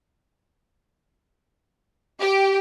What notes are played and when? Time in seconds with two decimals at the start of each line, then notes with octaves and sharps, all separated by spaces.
2.20 G4